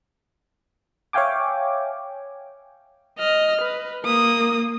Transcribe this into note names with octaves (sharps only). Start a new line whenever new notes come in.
C#5 E5 F5 G5 G#5 D6
D#5 F6
B4
A#3 D#6